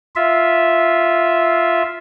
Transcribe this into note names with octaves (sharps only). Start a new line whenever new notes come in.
F4 E5